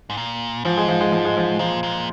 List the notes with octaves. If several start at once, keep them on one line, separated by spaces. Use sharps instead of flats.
G#2
A#2
G#2 F3
G#3
F3
G#3
F3
G#3
F3
A#2 F3
A#2